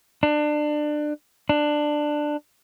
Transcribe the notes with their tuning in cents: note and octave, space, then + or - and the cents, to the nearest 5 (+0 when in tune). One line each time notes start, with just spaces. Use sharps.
D4 +25
D4 +15